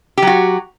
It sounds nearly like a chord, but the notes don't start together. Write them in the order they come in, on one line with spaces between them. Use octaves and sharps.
G4 F#3 F#4